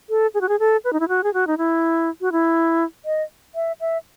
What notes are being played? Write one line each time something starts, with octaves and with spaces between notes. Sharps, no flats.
A4
G#4
F#4
G#4
A4
B4
D#4
E4
F#4
G#4
F#4
D#4
E4
F#4
E4
D#5
E5
E5